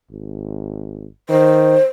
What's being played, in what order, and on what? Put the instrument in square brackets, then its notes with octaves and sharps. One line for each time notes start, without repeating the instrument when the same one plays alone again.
[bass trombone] G#1
[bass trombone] D#3 [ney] C5